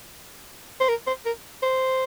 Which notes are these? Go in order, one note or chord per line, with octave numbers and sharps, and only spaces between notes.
C5
A#4
C5
A#4
C5